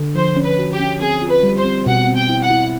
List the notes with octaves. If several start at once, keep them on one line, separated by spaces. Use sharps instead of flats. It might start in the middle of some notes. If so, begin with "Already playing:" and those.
Already playing: D3
F3 C5
C#4
B4
F#4
G4
C#4
C4 G#4
F4
B4
G3
C5
C4
B2 F#5
C4
G5
E4
F#5
E4